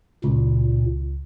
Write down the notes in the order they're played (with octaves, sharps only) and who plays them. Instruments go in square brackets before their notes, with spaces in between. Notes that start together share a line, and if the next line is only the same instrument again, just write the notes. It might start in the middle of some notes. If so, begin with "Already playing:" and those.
[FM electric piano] C#2 [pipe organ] A#2